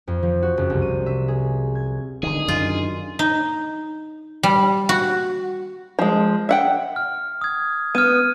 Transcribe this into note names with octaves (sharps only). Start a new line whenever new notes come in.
F2
F3
F#4
F#1
C2
D#7
E5
G#4
G#6
D3 D#3 G#4
F#2 F4
D#4
G3
F#4
F3 G#3
E5 F#5 G5
F6
D#6 G#6
B3 F6 D#7